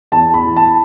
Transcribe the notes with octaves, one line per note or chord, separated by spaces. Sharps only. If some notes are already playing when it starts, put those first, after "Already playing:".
E2 A5
B5
E3
A5